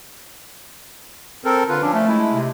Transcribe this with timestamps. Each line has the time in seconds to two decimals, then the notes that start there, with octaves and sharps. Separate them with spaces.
1.45 C4 A4 A#4
1.69 D3 F4 B4
1.82 F3 C#4 D4
1.94 A3
2.08 G#3 E4
2.34 C3